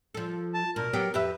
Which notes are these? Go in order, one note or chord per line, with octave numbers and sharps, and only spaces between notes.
F3 A4
A5
D2 B2 A#4
F#3 B3 G4
F2 G4 B4 E5